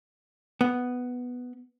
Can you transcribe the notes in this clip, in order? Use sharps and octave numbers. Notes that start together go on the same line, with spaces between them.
B3